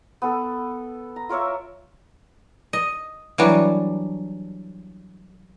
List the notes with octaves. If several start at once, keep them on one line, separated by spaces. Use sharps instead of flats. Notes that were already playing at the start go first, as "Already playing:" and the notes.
B3 A4
A#5
F4 A#4 C#5 E5
D#5
E3 F#3 G3 D4